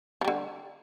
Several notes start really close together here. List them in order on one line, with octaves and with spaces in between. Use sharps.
F3 G3 D3